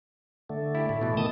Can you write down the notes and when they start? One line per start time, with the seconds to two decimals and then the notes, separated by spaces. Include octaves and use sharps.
0.49 D3 A3
0.75 E4 G4
0.89 A2 A3
1.01 B2 E3
1.17 D#3 A5 D#6